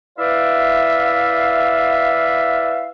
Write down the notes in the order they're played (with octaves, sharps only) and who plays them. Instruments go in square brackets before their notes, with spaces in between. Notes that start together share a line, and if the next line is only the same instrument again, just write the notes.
[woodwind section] E4 B4 D5 E5 F5